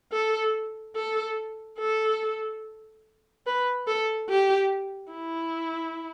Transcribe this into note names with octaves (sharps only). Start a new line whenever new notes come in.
A4
A4
A4
B4
A4
G4
E4